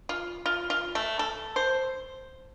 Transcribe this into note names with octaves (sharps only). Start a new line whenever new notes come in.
F4
F4
F4
A3
A4
C5